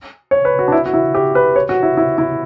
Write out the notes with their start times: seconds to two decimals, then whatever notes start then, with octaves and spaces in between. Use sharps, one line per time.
0.31 C#5
0.45 B4
0.59 F#4
0.68 D4
0.72 E4
0.86 F#4
0.94 E4
1.15 G4
1.35 B4
1.56 C#5
1.69 F#4
1.83 E4
1.97 E4
2.18 E4